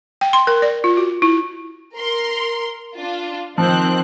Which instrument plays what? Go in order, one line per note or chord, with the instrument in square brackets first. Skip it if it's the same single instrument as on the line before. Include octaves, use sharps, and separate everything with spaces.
[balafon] G5
C6
A#4
D5
F4
F#4
E4
[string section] A#4 C6
D4 F4
[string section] D#3 C4 F#6 [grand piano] F3